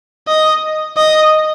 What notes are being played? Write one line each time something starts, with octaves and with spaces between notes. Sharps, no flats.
D#5
D#5